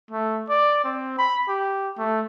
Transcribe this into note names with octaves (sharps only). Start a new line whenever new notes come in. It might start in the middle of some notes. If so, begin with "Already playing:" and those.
A3
D5
C4
B5
G4
A3